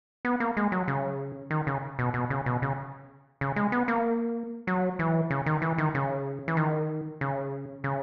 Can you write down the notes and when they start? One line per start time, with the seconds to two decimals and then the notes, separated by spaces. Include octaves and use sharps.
0.25 B3
0.40 A#3
0.57 G#3
0.72 F#3
0.88 C#3
1.51 D#3
1.67 C#3
1.99 B2
2.14 B2
2.30 C#3
2.46 B2
2.62 C#3
3.41 C#3
3.56 G#3
3.72 B3
3.88 A#3
4.67 F#3
4.99 E3
5.31 C#3
5.46 D#3
5.62 E3
5.78 D#3
5.95 C#3
6.48 E3
6.57 D#3
7.21 C#3
7.84 C#3